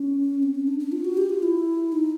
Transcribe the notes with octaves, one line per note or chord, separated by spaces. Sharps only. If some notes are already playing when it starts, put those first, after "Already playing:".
Already playing: C#4
C4
C#4
D4
D4
F4
F#4
G4
F4
E4
D#4